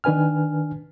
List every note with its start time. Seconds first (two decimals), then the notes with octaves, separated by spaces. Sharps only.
0.04 D#3 D4 B4 G#5 F6